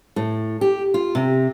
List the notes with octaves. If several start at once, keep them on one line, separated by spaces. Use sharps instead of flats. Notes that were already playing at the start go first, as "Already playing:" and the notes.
A2
G4
F4
C3